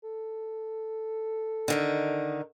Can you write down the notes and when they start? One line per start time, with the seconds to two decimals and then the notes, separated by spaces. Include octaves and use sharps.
0.03 A4
1.68 D3 D#3 D#4